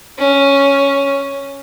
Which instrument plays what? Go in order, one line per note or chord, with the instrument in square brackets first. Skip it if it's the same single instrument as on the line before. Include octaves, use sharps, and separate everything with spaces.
[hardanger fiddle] C#4